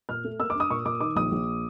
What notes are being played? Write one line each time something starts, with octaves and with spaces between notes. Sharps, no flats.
A#2 F6
A3
A#3 E6
D6
D4
D#6
A#2 C#6
A#2 D6
D#3 D6
A#1 D#6
A#1